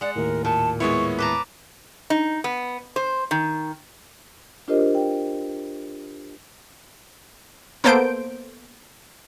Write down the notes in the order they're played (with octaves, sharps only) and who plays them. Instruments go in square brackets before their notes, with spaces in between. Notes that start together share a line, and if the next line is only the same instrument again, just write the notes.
[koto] G#3 F#5 [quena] D5
[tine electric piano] D#2 A2 [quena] A#4
[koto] A#2 [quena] A5
[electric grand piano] G#3 B3 E4 [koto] C#5 [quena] C#6
[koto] B4 A5 A#5 [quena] D6
[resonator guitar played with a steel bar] D#4
B3
C5
D#3
[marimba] D4 F4 G4 A#4 C5 D#5
G5
[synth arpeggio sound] A#3 B3 A4 C5 G6 D7